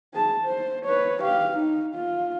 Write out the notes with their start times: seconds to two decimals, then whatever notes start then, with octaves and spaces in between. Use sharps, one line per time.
0.14 G#4 A5
0.44 C5
0.86 B4 C#5
1.22 G4 F5
1.52 D#4
1.95 F4